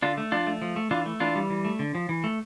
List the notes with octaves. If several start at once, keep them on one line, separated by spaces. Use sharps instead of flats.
D3 D4 F4
A3
F3 D4 F4
A3
F3
A3
E3 D4 F4
A3
E3 D4 F4
G3
E3
A3
D3
F3
E3
A3